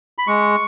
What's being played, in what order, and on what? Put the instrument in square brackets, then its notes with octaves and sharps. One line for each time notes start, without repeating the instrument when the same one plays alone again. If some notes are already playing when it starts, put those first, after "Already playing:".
[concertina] B5
G#3 C#6